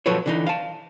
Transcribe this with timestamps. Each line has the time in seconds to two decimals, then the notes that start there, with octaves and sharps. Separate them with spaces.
0.06 A#2 F3 F#3 A4 B4 C#5
0.26 D3 E3 D#4
0.47 F5 A5